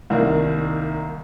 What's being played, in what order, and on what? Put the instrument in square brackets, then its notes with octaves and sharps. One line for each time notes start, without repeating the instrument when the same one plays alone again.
[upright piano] C2 D#3 A#3